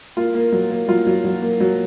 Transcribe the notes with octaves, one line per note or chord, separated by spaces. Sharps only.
A#3 F4
A#3
F#3
A#3
F#3 F4
F#3
F#3
A#3
F#3